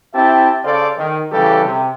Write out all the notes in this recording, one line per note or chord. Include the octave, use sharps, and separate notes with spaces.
C4 E4 G4 E5 G5 A5
C#3 A4 C5 D5 F5
D#3
C#3 E3 G3 G4 A4
C3